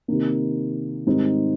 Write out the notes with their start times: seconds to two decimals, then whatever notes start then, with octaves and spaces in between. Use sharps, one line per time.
0.08 C3 D#3 A#3
1.07 G#2 D#3 G3 C4 D#4